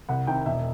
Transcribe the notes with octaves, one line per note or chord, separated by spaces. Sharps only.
C2 F#5
C3 D#3 G5
E1 E5